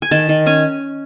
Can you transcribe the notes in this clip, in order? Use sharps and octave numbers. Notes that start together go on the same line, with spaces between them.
G#5
D#3 A5
D#3
C#4 G#5